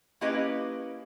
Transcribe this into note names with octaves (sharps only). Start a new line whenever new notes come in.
A#3 C#4 E4 G4 B4 D#5